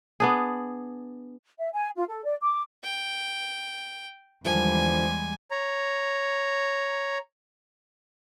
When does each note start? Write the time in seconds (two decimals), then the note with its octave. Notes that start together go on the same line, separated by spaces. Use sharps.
0.20 B3 D4 G#4
1.58 E5
1.73 G#5
1.96 F4
2.08 A4
2.24 D5
2.41 D6
2.84 G5
4.45 E2 D3 D#3 F3 G3 G#3 G#5
5.51 C#5 A#5